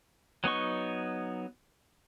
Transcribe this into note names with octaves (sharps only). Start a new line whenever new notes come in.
F#3 B3 D#4 C#6